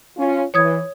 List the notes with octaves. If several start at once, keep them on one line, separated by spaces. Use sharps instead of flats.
C#4 F4
E3 C#5 D#6 G#6